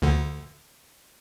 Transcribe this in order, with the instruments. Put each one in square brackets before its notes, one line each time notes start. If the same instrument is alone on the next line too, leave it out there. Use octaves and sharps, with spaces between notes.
[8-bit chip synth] D2 D3